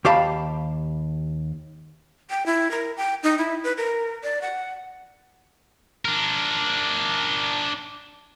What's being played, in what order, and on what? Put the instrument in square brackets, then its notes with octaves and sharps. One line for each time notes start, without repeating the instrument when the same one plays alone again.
[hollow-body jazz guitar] D#2 G4 F5 A5 B5
[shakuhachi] G5
E4
A#4
G5
D#4
E4
B4
A#4
D5
F#5
[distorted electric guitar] D4 A#4